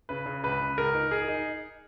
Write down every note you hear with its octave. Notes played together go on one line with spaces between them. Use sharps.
C#3 B4
C#3
C#2 B4
C#2
C#2 A#4
D#4
D#4 G#4
D#4